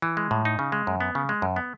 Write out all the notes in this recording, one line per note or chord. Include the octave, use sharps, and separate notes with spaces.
E3
G#3
A2
D#4
C#3
G#3
F#2
B3
C#3
G#3
F#2
B3